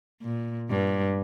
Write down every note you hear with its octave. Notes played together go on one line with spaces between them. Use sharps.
A#2
G2